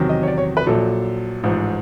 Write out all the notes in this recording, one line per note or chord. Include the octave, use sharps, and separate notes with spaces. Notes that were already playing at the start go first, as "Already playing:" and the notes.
Already playing: E2 C3 D#3 F#3
D#5
C#5
D5
C#5
B4
A#1 A#2 F#3 A4
A1 G#2 F3